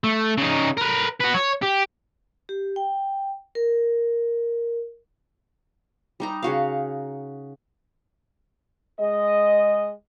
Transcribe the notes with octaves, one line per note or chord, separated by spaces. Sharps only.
A3
C#3 D#4
A#4 B4
F#4 B4
C#5
G4
G4
G5
A#4
G3 D#4 A#5
C#3 F#4 F5
G#3 D#5